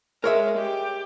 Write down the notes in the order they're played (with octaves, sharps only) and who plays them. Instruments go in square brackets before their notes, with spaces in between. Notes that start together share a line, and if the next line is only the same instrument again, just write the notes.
[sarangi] G#3 [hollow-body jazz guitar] A#4 C#5 E5
[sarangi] G4